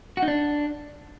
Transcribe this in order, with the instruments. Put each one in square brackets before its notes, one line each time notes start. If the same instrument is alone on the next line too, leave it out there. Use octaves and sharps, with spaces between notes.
[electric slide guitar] F#4
D#4
D4